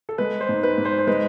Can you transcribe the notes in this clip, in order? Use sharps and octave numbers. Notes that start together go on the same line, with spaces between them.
A4
G#3 B4
C5
G#2
B4
G#2
C5
C5
G#3 B4